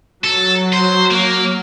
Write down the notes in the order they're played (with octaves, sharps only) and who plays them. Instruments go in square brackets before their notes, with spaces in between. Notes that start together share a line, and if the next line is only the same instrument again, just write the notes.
[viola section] F#3 [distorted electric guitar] A4
[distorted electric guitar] C5
A#3